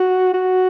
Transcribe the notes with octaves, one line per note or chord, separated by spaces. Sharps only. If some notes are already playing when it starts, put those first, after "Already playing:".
Already playing: F#4
F#4